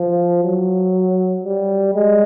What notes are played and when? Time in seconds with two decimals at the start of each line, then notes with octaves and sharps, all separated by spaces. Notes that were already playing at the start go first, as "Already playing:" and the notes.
Already playing: F3
0.43 F#3
1.44 G3
1.95 G#3